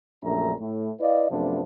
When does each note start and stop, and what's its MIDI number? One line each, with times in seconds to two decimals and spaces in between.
0.23 0.52 34
0.23 0.52 42
0.23 0.52 57
0.23 0.52 62
0.23 0.52 76
0.23 0.52 82
0.60 0.90 45
1.00 1.31 64
1.00 1.31 71
1.00 1.31 74
1.00 1.31 75
1.00 1.31 77
1.31 1.61 42
1.31 1.61 48
1.31 1.61 53
1.31 1.61 57
1.31 1.61 59
1.31 1.61 62